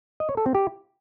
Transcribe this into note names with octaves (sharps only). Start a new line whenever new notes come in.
D#5
C#5
A4
C4
G4